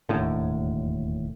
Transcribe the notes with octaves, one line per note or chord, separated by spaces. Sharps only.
E1 D#2 A2 D3